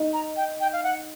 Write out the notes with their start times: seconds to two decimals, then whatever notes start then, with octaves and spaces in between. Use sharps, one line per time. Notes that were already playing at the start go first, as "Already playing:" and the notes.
Already playing: D#4
0.13 A#5
0.37 G5
0.60 G5
0.73 F5
0.83 F#5